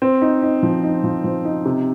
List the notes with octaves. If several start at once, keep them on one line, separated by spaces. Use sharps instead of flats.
C4
D#4
D#4
F3
D#4
F3
F3
D#4
C3